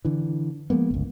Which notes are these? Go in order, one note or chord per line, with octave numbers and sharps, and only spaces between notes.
D3 E3
F3 G#3 A#3 B3
G1 C#2